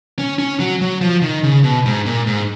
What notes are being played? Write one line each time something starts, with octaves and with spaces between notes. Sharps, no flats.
C#4
C#4
F#3
F#3
F3
D#3
C#3
B2
G#2
A#2
G#2